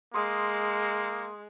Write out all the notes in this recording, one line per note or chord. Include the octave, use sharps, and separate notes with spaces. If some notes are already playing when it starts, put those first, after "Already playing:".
G#3 A#3 C6 D#6